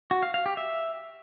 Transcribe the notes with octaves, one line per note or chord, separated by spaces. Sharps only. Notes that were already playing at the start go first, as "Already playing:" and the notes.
F#4
F5
F5
G4
E5